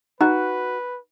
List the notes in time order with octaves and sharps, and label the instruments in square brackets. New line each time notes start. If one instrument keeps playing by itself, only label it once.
[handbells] D#4 [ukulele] F#4 [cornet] B4